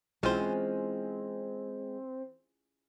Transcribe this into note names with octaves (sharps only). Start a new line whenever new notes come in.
B1 E3 G#3 C4 C#4 F4 C5